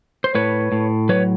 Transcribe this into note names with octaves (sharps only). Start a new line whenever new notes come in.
C5
A2 B4 C#5
A2
F#3 B4 C#5